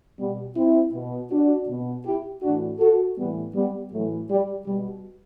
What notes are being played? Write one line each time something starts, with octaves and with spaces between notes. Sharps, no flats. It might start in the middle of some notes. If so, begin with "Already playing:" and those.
B2 G3 B3
C4 E4
B2
D4 F#4
B2
E4 G4
A2 E3 D4 F#4
F#4 A4
A2 E3 G3 B3
G3 B3
A2 E3 F#3 A3
G3
B2 G3